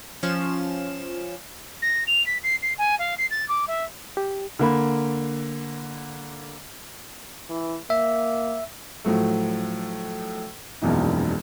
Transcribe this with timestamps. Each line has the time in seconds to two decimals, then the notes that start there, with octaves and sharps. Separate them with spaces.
0.23 F3 C#4 F5 E7
1.82 A#6
2.07 F7
2.26 B6
2.43 C7
2.62 C7
2.78 G#5
2.99 F5
3.18 C7
3.31 A6
3.49 D6
3.68 E5
4.17 G4
4.59 D3 A#3 B5
7.49 E3
7.90 A#3 E5
9.05 A2 F3 F#3 A3
10.82 E1 A#1 F#2 B2 E3 D#4